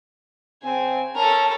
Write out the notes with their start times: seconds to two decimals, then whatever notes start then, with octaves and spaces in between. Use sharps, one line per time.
0.63 C#3 C4 G#5
1.16 C#4 A4 A#4 A5